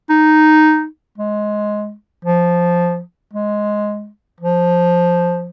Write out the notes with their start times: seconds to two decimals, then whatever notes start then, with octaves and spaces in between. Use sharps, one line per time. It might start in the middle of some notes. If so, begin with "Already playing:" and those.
0.10 D#4
1.18 G#3
2.25 F3
3.33 G#3
4.40 F3